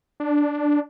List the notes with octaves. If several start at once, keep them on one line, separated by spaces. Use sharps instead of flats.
D4